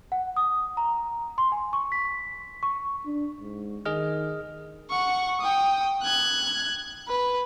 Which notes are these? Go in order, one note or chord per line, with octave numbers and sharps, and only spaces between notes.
F#5
D#6
A#5
C6
G#5
C#6
B6
C#6
D4
G#2
D#3 G#4 D#5 F6
F#5 C#6
G5 D#6
F#6 G#6
B4